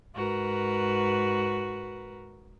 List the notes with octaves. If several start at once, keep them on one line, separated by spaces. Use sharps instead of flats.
G#2 F#4 A#4 B4